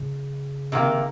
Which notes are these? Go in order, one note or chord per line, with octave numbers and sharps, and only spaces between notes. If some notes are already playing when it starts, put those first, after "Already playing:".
Already playing: C#3
C3 D#3 A#3